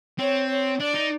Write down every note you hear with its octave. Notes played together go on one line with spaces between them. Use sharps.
C4 C#5
C#5
D4 D5
D#4